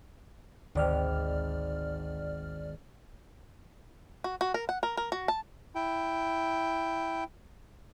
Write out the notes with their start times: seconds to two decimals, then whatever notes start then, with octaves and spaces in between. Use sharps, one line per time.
0.75 G#1 D2 D5 F6
4.24 F#4
4.41 F#4
4.54 A#4
4.69 F#5
4.83 A#4
4.97 A#4
5.12 F#4
5.28 A5
5.75 E4 G5